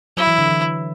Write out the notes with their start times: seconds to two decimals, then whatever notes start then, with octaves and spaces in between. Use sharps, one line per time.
0.17 F#3 E4
0.27 E3
0.38 D3
0.48 E3